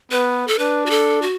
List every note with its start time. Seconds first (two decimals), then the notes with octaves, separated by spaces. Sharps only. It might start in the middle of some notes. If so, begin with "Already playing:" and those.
0.11 B3 B4
0.48 A4
0.59 D4 B4
0.86 F#4
0.90 A4
1.22 F#4